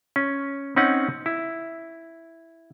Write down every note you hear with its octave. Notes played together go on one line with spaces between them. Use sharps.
C#4
C4 C#4 D#4 F#5
E4